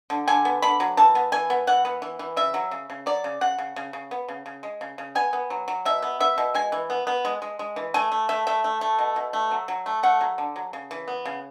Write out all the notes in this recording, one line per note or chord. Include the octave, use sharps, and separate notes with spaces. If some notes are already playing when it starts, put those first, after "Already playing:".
D3
D3 G#5
B3
D3 B5
F#3
E3 A5
B3
E3 G#5
B3
E3 F#5
B3
E3
E3
C#3 E5
F#3
C#3
C#3
F#3 D5
C#3
C#3 F#5
C#3
C#3
C#3
B3
C#3
C#3
G#3
C#3
C#3
B3 G#5
B3
F#3
F#3
B2 E5
B3
B3 E5
B2
G#3 G#5
E3
B3
B3
G#3
G#3
G#3
E3
A3 G#5
A3
A3 E5
A3 E5
A3
A3
B2
B2
A3
F#3
F#3
A3
A3 F#5
F#3
D3
F#3
C#3
E3
B3
C#3